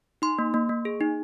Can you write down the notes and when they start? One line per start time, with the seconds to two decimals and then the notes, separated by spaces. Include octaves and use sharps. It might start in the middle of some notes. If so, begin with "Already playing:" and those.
0.22 D#4 C6
0.39 A#3
0.54 A#3
0.69 A#3
0.85 G#4
1.00 D#4